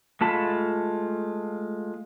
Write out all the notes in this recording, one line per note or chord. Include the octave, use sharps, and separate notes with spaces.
G#3 A3 F4 A5 B5